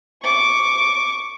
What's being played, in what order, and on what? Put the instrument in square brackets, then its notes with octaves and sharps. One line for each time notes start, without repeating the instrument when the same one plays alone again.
[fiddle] C#6 D6